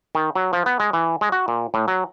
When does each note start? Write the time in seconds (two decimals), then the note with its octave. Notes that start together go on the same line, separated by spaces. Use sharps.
0.15 D#3
0.35 F#3
0.53 F3
0.66 B3
0.80 G#3
0.93 E3
1.21 G#3
1.32 F#4
1.48 A#2
1.74 A2
1.88 F#3